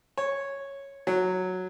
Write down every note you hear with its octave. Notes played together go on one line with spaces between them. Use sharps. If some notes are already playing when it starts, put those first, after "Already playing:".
C#5
F#3